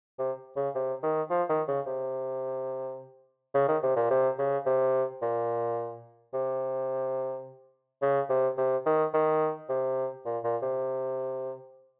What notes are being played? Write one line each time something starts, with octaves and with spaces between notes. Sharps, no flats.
C3
C#3
C3
D#3
F3
D#3
C#3
C3
C#3
D#3
C3
A#2
C3
C#3
C3
A#2
C3
C#3
C3
C3
D#3
D#3
C3
A#2
A#2
C3